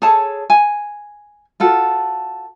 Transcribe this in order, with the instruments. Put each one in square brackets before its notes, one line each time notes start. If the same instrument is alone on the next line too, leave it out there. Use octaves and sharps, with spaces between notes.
[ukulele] G#4 A4 C#5 A5
G#5
F4 F#4 A4